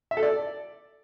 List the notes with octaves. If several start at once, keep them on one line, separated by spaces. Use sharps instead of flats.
E5
A4
D5